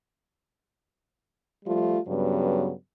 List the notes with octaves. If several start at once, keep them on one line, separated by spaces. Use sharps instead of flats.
F3 G3 A3 F4
G2 C#3 F#3 B3